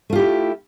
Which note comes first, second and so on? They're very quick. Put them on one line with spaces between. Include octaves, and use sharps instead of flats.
A3 F4 G4 E4